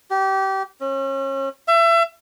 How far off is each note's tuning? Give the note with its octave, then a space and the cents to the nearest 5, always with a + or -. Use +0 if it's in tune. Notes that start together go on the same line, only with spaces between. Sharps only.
G4 -25
C#4 -35
E5 +30